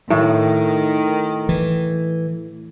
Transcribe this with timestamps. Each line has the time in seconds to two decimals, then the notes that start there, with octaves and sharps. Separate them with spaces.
0.10 A2 D#3
1.49 E3